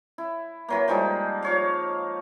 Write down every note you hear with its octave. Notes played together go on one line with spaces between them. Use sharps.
E4
E3 F#3 A#3
F3 G3 G#3 D#4
F3 C#5 F5